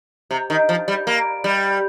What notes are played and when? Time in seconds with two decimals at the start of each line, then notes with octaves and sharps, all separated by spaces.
0.31 C3
0.50 D#3
0.69 F3
0.88 G3
1.07 A#3
1.44 G3